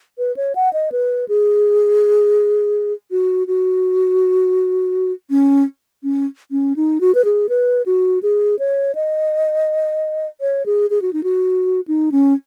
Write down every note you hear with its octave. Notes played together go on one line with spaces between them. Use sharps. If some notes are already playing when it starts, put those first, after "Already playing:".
B4
C#5
F#5
D#5
B4
G#4
F#4
F#4
C#4
C#4
C#4
D#4
F#4
B4
G#4
B4
F#4
G#4
C#5
D#5
C#5
G#4
G#4
F#4
D#4
F#4
D#4
C#4